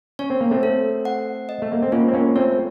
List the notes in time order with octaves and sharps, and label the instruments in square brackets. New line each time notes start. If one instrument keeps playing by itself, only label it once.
[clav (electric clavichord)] C#4 [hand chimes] C#5
[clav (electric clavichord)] C4
A#3
A3 C4
[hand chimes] A4
F#5
D#5
[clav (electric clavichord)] A3
A#3
C4
[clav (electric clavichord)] A#3 C#4 [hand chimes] F4
[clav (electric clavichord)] C4
A#3 C#4
[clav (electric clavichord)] A3 C4 [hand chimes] C#5